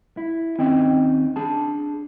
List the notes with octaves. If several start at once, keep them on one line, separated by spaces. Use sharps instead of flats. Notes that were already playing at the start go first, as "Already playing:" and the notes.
E4
D#2 C4 C#4 D#4 D#5 G5
D4 G#4 A5